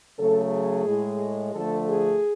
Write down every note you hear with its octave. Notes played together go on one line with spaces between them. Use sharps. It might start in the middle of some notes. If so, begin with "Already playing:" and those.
C#3 F#3 A3 A4
G#4
A2 G#3
D3 F3 A3 A4
G#4